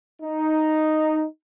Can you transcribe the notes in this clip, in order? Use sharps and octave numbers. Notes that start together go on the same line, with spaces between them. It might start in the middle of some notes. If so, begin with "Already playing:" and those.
D#4